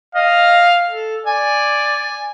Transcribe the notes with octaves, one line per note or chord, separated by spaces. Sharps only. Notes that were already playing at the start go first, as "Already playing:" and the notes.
D#5 F5
A4
D5 G#5